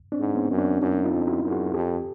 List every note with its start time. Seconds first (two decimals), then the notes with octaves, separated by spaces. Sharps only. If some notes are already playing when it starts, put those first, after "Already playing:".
0.12 C4 D4
0.20 G#2
0.35 B3 C#4
0.51 F#2
0.58 C4 D4
0.81 F#2 C#4 D#4
1.04 D#4 F4
1.12 F2
1.27 E4 F#4
1.43 F#2
1.50 F#4 G#4
1.74 F2 G4 A4